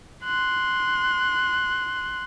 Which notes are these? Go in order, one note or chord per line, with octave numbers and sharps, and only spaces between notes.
C6 F#6